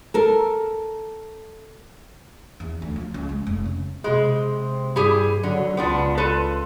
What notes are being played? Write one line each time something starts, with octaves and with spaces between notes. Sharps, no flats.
A4 A#4
E2
D2
F3
C#2
G#3
F1
C#3
C3 G#3
G2 E4 G4 G#4
D3 F#3
C#2 B3 D4 F4
F4 A4 B4